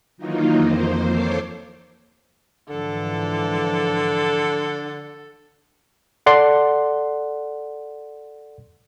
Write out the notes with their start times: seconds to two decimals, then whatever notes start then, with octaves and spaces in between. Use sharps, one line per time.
0.17 D#3 E3 F#3 A#3 D#4 F4
0.56 F2 A#3 C5
1.05 A4 C5 C#5 C6 D6
2.69 G#2 D3 E3 F3 A4
6.26 A4 D5 F#5 C6